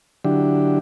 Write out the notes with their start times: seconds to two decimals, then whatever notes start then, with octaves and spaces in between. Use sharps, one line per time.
0.25 D3 F#3 D4 E4 G4